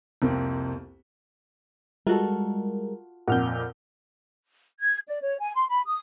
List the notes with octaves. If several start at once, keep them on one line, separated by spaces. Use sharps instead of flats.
C2 F2 A#3 C4
G3 G#3 F4 F#4 A4 A#4
F2 A#2 F#5 F6 G6
G#6
D5
C#5
G#5
C6
B5
D#6